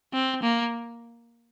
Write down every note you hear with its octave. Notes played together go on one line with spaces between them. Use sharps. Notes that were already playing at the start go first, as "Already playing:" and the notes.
C4
A#3